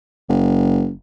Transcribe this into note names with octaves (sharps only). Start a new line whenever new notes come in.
F#1